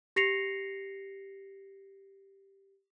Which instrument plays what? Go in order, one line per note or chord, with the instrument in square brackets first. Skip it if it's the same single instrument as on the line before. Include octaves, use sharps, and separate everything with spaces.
[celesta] G4 A#6 C7 C#7 F7